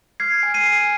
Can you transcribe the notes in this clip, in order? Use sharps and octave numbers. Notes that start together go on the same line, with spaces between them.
F6 G#6 C7
G#5
C7 D#7
G#5